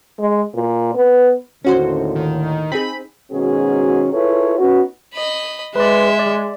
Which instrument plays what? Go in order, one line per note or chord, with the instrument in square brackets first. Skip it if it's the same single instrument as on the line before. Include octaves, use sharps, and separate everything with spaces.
[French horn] G#3
A#2
B3
[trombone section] D#2 A2 D3 [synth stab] C#4 F#4 C5
[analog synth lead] D#3
[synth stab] C4 D#4 G#4 [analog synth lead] B5
[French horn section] G#2 B2 D#3 C#4 F#4 G#4
E4 F4 G#4 A4 B4 C#5
B3 C#4 D#4 F#4
[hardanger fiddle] D#5 B5
[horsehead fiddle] G#3 [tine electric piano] B4 D5 [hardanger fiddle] E5 C6
[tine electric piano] D5